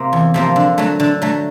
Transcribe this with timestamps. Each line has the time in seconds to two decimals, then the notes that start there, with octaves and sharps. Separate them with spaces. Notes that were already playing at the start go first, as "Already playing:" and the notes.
Already playing: C3 A#3
0.13 E2
0.34 C3 F3 A#3
0.56 D3
0.78 F#3 A3
1.00 D3
1.22 F#3 A3